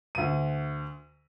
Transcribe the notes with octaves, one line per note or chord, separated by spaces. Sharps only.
D2 D#7